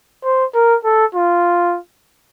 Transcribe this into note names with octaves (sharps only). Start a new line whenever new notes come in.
C5
A#4
A4
F4